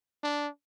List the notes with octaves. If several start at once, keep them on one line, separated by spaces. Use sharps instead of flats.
D4